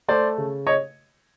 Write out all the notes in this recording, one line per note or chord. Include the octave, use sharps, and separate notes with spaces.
A3 C5 D5
C#3
C#5 D#5